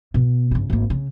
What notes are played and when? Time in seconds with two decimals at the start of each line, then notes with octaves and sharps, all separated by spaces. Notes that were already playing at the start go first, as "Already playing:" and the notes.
0.14 B2 B3
0.51 G1 C#3
0.70 G#1 A#3
0.90 C#3